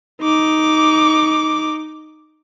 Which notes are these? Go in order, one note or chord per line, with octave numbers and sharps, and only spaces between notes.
D#4 D6